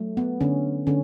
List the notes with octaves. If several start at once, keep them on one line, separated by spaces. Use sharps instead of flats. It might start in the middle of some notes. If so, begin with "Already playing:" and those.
Already playing: F#3 A3
B3
D3 C#4
D3 C#4